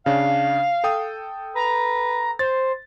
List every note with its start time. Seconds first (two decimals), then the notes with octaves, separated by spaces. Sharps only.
0.06 C#3 D4 F5
0.84 A4 G5 D#6
1.55 B4 A#5
2.39 C5 A6